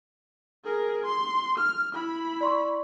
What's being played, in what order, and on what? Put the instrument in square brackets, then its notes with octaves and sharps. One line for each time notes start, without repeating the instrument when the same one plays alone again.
[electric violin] G#4 A#4
C6
F6
E4 B5
[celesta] D5 C6 C#6